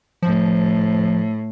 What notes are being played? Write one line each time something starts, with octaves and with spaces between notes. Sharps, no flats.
A2 F3